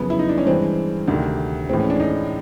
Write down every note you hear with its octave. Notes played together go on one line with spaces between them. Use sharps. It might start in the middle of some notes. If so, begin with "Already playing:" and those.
Already playing: F#2 C#3 F3 B3
E4
D#4
D4
C#4
G2 E3 G#3 C4
D2 C3 D#3
A2 E3 G#3 C4
C#4
D4
D#4